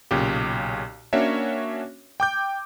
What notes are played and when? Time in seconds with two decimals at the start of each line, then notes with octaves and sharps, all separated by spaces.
0.11 B1 A#2 C#3 G4
1.13 A#3 C#4 D4 F#4 C#5 E5
2.20 G5 D6 G6